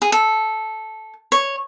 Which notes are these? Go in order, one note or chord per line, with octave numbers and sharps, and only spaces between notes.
G#4
A4
C#5